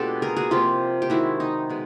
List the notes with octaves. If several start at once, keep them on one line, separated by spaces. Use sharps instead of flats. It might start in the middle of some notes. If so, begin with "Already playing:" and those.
Already playing: B2 G#3 B3 D4 F4 G4 A4
G#4 A#4
F#4 G#4
C3 F3 A#3 F4 G4
G4
D#3 G#3 C4 E4 F#4
D#4
B2 G#3